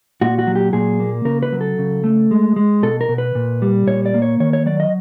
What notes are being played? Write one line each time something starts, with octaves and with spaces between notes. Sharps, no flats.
A#2 F#4
F#4
F#3
G4
A#2 G#4
A#3
C#3 A#4
B4
F#3
A4
C#3
A3
G#3
G#3
B2 A4
A#4
B2
B4
A#2
G3
A#2 C#5
D5
A#3
C#5
D#3 C#5
C#5
F#3 D5
D#5